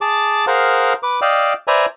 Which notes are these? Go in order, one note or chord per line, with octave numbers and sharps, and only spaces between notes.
G#4 A5 D6
G#4 A#4 C5 F5 F#5
B4 D6
D5 D#5 F5 G5 E6
B4 C5 D5 E5 G#5 A#5